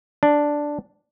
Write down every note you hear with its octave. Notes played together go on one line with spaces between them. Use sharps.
D4